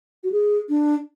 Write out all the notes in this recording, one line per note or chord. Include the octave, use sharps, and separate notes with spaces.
F#4
G#4
D4